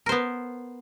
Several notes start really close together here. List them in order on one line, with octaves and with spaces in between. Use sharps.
A#4 C5 B3